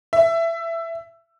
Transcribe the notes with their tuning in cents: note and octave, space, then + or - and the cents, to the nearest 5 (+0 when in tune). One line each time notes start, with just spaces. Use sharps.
E5 +15